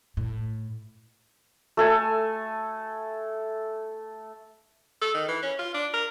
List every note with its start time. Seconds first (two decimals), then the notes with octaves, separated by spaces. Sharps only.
0.17 A2
1.77 A3 A4 G#5
5.02 A4
5.14 D#3
5.28 E3
5.42 C#4
5.59 F4
5.74 D4
5.94 A#4